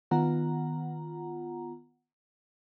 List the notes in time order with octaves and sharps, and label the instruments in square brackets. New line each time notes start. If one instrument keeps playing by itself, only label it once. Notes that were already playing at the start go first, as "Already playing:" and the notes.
[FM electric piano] D#3 B3 F4 F#5 A#5